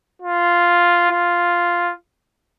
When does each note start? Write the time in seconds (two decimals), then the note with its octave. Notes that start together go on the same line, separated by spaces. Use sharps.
0.22 F4
1.11 F4